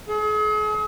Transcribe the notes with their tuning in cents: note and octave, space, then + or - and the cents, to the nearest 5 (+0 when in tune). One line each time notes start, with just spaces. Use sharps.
G#4 +40